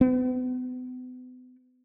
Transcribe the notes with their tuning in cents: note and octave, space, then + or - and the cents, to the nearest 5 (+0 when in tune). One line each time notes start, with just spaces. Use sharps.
B3 +40